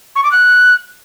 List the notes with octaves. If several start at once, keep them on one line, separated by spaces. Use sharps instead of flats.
C#6
D6
F#6